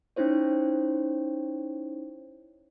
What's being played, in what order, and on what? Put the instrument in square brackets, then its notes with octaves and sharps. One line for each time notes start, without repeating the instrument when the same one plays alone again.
[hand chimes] C#4 D#4 E4 C5 C#5